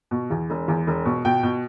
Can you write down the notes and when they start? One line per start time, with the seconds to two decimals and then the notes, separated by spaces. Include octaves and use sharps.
0.11 B2
0.30 E2
0.50 E1
0.68 E2
0.87 E1
1.05 B2
1.25 B2 G5
1.43 B2